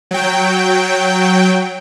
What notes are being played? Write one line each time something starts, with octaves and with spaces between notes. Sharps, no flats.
F#3 G5